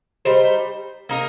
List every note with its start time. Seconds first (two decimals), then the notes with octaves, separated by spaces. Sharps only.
0.25 G3 D#4 C5
1.09 A#3 D#4 A#4